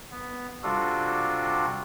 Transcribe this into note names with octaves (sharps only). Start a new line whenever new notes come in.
B3
C3 G3 D4 F4 F#4 A4